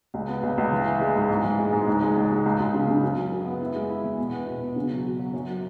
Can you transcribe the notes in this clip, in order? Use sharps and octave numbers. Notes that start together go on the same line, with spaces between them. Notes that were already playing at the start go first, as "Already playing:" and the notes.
C#2
B3
C#2
C#2
E3
E4
G#3
G#2
G#2
E3
G#3
G#2
C#2
G#3
C#2
C#2
C#2
C#2
C#3
C#3
F#2
F#2
F#2
B3
E4
G#3
E4
E2
B2
B3
B2
B2
C#3
F#3
F#4
F#3
F#2
F#3